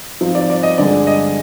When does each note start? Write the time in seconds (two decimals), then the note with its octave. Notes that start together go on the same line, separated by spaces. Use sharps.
0.21 G#2 F3 C4 D#4
0.35 D5
0.50 D5
0.63 D#5
0.78 G2 D3 G#3 D5
1.07 D#5